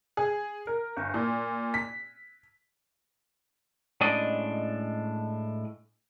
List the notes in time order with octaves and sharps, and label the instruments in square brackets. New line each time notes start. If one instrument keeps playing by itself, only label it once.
[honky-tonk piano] G#4
A#4
G1
A#2
B6
[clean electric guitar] A2 G#3 C#4 D4 D5 D#5